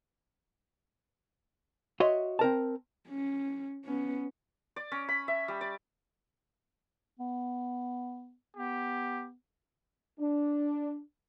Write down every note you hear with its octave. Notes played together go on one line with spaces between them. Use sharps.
F#4 C#5 D#5 E5 C6
C4 A#4 A5
C#4
B3 C#4
D5
C#4
B5
E5
G3
D5
B3
B3 G4
D4